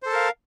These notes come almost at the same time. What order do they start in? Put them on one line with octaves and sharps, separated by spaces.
C5 A4 A5 A#4 F5